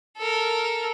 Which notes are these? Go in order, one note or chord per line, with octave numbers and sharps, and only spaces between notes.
A4 A#4